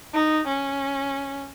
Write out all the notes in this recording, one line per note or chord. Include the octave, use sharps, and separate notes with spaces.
D#4
C#4